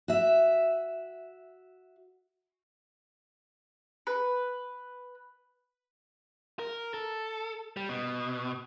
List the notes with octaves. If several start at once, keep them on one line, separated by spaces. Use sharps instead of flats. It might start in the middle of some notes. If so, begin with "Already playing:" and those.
F#4 E5
B4
A#4
A4
G3
B2